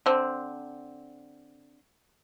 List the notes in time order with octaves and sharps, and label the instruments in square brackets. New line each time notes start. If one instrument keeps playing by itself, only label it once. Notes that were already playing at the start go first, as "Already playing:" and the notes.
[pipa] D3 C4